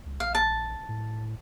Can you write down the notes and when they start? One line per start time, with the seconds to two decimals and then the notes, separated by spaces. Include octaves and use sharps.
0.06 C#2
0.20 A#1 F5
0.35 A5
0.89 A2